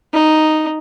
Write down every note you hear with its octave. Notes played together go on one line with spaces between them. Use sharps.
D#4